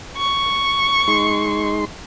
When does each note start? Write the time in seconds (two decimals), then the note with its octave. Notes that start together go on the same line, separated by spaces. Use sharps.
0.17 C#6
1.08 G#3 D#4 C6